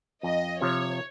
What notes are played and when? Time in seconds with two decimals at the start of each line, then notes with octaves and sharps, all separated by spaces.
0.23 F2 D#5
0.62 C3 F3 C#5